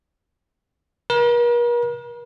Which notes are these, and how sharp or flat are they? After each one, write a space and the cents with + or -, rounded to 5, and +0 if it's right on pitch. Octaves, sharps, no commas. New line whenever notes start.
A#4 +45